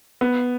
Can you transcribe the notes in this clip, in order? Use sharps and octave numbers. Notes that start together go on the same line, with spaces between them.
B3